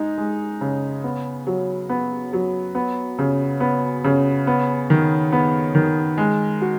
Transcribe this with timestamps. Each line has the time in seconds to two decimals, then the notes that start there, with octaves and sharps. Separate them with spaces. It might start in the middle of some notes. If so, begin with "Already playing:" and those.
Already playing: G#3 D#4
0.18 G#3
0.61 C#3
1.04 B3
1.47 F#3
1.89 B3
2.33 F#3
2.75 B3
3.19 C#3
3.60 B3
4.04 C#3
4.47 B3
4.90 D#3
5.33 B3
5.75 D#3
6.18 G#3
6.61 F#4